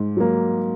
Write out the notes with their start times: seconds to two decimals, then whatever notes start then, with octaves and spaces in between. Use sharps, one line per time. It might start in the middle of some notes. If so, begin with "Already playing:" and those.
Already playing: G#2
0.17 F#3 A#3